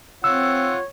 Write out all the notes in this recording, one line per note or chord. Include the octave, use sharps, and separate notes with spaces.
C4 F4 C#5 F#5 E6